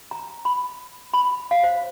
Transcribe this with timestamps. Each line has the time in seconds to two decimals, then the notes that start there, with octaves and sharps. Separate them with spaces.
0.11 A#5
0.45 B5
1.14 B5
1.51 F5
1.64 C5